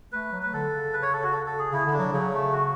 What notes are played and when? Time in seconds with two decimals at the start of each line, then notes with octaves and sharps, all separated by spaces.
0.12 A3 B4
0.32 F#3
0.42 B4
0.53 D3 A4
0.73 C#3
0.93 B4
1.02 C#5
1.13 A4
1.23 F#4
1.33 A4
1.46 A4
1.59 G#4
1.72 C#3 E4
1.86 D3
1.93 D4
1.99 F#3
2.12 C#3 F#3
2.33 A3
2.53 F#4